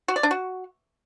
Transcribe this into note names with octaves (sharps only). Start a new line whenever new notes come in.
F#4
D5
D4
F#4